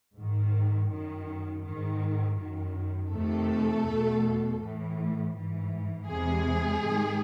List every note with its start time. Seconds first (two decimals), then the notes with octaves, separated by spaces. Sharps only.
0.15 G#2 D#3
0.89 F#2 D#3
1.63 G#2 D#3
2.37 F#2 D#3
3.11 F2 C3 D#3 A3 A4
3.86 E2 B2
4.59 A2 E3
5.34 G#2 E3
6.08 E2 C3 E3 G#3 G#4
6.82 G#2 D#3